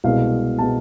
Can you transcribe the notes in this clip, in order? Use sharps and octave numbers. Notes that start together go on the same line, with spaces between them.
C2 B2 G#3 F5
B2 G#3 A5